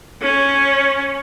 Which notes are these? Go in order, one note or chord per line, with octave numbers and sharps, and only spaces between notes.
C#4